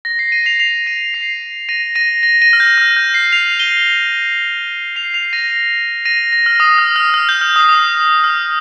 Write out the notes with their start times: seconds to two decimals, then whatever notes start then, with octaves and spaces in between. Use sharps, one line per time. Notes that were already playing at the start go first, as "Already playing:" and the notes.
0.05 A#6
0.19 C7
0.32 A#6 D#7
0.46 C7 F7
0.60 C7 F7
0.86 A#6 D#7
1.14 C7
1.69 A#6 D#7
1.95 A#6 D#7
2.23 A#6 D#7
2.42 A#6 D#7
2.53 F6
2.60 G6
2.78 F6
2.96 G6
3.14 C7
3.32 C7 F7
3.59 D#7 G7
4.96 C7 F7
5.14 C7 F7
5.33 A#6 D#7
6.05 A#6 D#7
6.32 A#6
6.46 F6
6.60 D#6
6.78 F6
6.96 F6
7.14 F6
7.29 G6
7.41 F6
7.56 D#6
7.69 D#6
8.24 F6